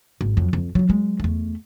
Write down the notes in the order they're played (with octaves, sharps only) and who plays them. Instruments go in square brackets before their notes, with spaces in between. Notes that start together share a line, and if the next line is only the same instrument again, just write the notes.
[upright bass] G#1
F2 F#3
F2
F#3 F4
F#3 G#3
E2 A3